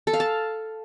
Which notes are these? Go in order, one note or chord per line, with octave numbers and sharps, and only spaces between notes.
A4
F5
A5